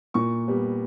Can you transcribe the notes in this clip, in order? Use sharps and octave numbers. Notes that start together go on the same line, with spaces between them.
A#2 C#6
G3 B3